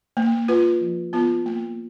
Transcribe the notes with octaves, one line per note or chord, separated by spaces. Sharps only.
A#3
F4 B4
F3
B3 F4 B4
A#3